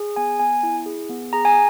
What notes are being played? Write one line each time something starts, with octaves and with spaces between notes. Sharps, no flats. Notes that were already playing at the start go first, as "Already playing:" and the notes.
Already playing: G#4
B3 G#5
B3 G#5
E4
G#4
B3
G#4 A#5
G#5